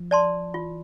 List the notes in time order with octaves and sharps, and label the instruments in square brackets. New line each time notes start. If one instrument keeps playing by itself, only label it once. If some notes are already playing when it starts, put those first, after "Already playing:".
Already playing: [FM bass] F3
[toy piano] D5 A5 C6
[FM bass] E3 [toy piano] F4